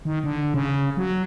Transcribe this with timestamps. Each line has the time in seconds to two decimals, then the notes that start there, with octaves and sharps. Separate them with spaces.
0.05 D#3
0.24 D3
0.54 C#3
0.97 F#3